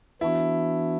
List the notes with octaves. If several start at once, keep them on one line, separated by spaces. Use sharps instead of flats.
E3 B3 D4 E4 F#4